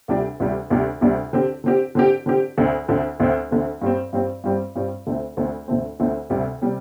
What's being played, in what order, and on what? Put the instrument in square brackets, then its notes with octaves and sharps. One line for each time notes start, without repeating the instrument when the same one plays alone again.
[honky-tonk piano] D2 C3 G3 D4 G4
D2 C3 G3 D4 G4
D2 C3 G3 D4 G4
D2 C3 G3 D4 G4
D3 C4 G4
D3 C4 G4
D3 C4 G4
D3 C4 G4
D2 D3 C4
D2 D3 C4
D2 D3 C4
D2 D3 C4
G2 G3 C4
G2 G3 C4
G2 G3 C4
G2 G3 C4
D2 D3 A3 C4
D2 D3 A3 C4
D2 D3 A3 C4
D2 D3 A3 C4
D2 C3 G3
C3 G3